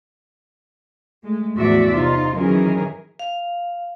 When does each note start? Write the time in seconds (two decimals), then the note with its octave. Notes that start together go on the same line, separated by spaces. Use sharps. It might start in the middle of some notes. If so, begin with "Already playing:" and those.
1.23 G#3 A3
1.56 E2 A2 F3 F#4 D5 E5
1.94 C3 D#4 F4
2.36 D#3 E3 F#3 C#4 G#4 A#4
3.19 F5